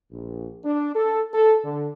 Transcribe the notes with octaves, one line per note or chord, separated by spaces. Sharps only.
A#1
D4
A4
A4
D3